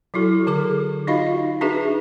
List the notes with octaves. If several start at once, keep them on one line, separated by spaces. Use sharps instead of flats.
F#3 E4 F#4 A4
D3 G#4 A4 D6
D#4 F4 F#4 D#5 F5 B5
D4 D#4 F#4 G#4 B4 E5